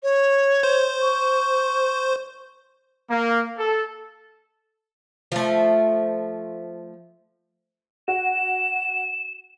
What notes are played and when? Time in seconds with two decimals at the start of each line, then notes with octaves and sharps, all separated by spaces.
0.03 C#5
0.63 C5
1.01 C#6
3.10 A#3
3.58 A4
5.32 F3 A3
8.08 F#4 E7